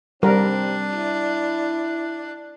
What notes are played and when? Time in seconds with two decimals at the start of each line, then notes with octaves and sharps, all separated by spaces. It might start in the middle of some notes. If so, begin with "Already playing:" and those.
0.23 G3 C4 D4 A#4
0.92 E4